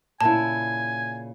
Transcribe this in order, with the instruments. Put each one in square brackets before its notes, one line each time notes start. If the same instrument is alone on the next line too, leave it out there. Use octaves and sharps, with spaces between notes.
[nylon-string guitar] A#2 C#3 E4 [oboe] G#5 [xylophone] A5